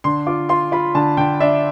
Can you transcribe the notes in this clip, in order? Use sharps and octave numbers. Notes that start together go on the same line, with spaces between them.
D3 C6
F4 D6
F4 C6
F4 B5
D3 A5
D3 G5
D4 E5